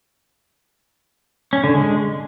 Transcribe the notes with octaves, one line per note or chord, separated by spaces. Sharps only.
C#4
D3
G#3